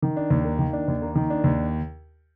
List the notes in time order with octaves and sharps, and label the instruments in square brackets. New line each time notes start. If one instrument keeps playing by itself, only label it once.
[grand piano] D#3
D4
D#2
A#3
D#3
D4
D#2
A#3
D#3
D4
D#2